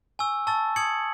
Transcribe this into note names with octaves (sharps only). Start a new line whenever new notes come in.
G#5 C#6 E6
A5 C#6 E6 A6
D#6 G#6 C#7 F#7